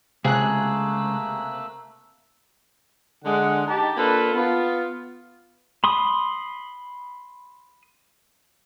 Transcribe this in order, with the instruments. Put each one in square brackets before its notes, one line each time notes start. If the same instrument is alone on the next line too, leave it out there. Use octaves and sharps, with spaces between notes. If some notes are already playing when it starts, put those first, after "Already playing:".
[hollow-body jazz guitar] C#2 [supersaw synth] C3 F#6 [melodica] A3 A#3 E6 [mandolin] G#4
[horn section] D3 G#3 F#5
D#4 G4 A5
A#3 D4 F4 A4 B4
B3 F4
[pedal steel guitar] B5 C6 D#6